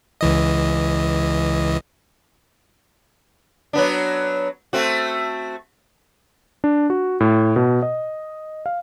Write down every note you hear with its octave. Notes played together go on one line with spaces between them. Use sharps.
C#2 E3 D#5
F#3 B3 D4
A3 C4 F#4
D4
F#4
A2
B2
D#5
F5